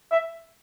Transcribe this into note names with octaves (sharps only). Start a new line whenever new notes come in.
E5